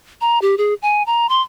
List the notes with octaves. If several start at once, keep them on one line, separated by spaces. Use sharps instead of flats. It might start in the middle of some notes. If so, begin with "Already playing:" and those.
A#5
G4
G#4
G#5
A#5
C6